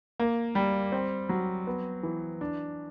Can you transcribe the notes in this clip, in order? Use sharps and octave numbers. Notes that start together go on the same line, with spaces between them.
A#3
G3
C4
F#3
B3
E3
D4